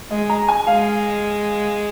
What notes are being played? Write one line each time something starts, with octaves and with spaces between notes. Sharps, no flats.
G#3 D#5
A#5
G#5
G#3 F5